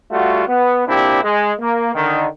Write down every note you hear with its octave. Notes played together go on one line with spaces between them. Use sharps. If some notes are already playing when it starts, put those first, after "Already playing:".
G3 A3 F4 F#4
B3
A#2 C4 D4 E4 G4
G#3
A#3
D3 D#3